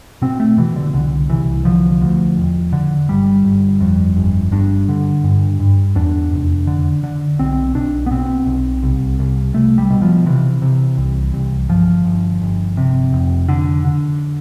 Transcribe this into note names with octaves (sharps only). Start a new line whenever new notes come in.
B2 C4
A3
B2 E3
D3
C2 D3
C2 E3
D3 F3
D2
E1
D3
G1 G3
G1
F2
G1
G2 D4
D3
G2
G2
E2 D4
F1
D3
D3
B1 C4
B1 D4
B3
B2 C4
B1
C2
C2
C2 A3
G3
B2
F3
C3 E3
C3
C2
C2
G1 F3
G1
G1
C3
F1
D3
D3